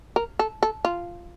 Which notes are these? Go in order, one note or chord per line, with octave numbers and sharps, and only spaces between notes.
A#4
A4
A4
F4